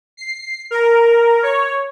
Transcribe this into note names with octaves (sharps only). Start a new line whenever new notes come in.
C7
A#4
C#5